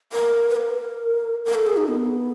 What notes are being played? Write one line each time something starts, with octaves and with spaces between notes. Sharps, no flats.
A#4
B4
A#4
A#4
A4
G#4
D#4
B3